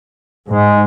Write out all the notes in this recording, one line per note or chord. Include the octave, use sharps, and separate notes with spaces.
G#2 G#3